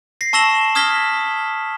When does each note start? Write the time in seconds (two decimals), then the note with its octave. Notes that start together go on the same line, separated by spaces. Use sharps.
0.21 A#6 C7
0.33 A5 C#6 E6 A#6 E7 F#7
0.75 D#6 F6 G#6 A#6 B6 G7